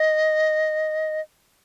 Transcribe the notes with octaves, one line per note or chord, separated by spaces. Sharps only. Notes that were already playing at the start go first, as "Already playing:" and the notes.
Already playing: D#5